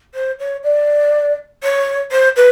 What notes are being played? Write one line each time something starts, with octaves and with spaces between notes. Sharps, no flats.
C5
C#5
D5
C#5
C5
B4